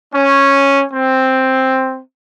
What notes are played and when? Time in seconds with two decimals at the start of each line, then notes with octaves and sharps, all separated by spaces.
0.13 C#4
0.93 C4